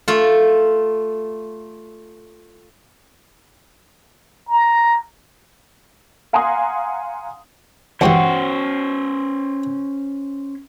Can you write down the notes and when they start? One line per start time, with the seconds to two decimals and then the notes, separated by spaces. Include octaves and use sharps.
0.08 A3 F4
4.48 A#5
6.33 F5 F#5 G#5 A#5 C6 D#6
8.01 C#2 G2 E3 C#4 F#4 C5 F#5 G5